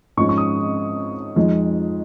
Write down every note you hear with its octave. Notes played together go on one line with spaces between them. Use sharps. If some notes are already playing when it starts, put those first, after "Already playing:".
G#2 F3 G#3 C#4 C#6
C#6
D#6
F2 F3 G#3 D#4